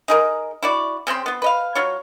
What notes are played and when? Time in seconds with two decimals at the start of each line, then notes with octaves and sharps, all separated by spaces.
0.08 D#4 G#4 A#4
0.63 E4 F#4 D5
1.07 C#3 C4 G5 C6
1.26 B3 F4
1.42 B4 D#5 F5
1.75 F#3 F4 C#5